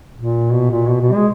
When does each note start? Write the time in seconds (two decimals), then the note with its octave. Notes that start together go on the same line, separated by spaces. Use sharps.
0.16 A#2
0.53 B2
0.71 A#2
0.89 B2
1.01 B2
1.13 G#3